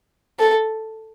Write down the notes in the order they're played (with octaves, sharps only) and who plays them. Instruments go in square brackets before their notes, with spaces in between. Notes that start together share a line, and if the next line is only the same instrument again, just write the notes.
[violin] A4